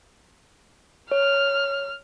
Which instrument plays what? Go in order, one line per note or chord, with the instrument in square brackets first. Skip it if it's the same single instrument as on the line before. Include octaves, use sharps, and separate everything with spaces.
[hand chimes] C#5 [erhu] F6